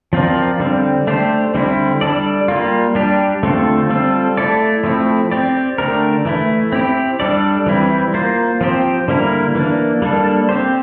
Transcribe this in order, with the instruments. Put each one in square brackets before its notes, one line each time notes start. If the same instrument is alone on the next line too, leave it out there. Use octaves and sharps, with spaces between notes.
[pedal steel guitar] F3 C4 F4 A#4 D5
D3 G3 C4
A3 D4 G4 C5
D3 G3 C4 E4
G3 D4 A4 D5
G3 A#3 F4
G3 D4 G4
D3 A3 C4 F4 A4
G3 C4 F4 A4
A3 E4 A4 D5
F3 A3 C4 E4
C4 G4 D5
D3 A3 D4 G4 A#4
E3 A3 E4
C4 E4 G4
G3 D4 A4 D5
E3 G3 C4 E4
A#3 F4 C5
F3 C4 G4 C5
D3 G3 A#3 E4 A#4
E3 A#3 D4
G3 A#3 D4 A4
C4 G4 C5